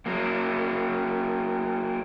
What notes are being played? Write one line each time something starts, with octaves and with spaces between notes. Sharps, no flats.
F#3 A#3